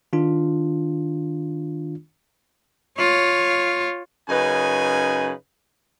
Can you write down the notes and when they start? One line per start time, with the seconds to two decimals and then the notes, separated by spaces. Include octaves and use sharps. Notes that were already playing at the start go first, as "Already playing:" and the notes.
0.13 D#3 D4 F4
2.98 F4 C#5
4.29 F#2 C#3 D#4 B4 G#5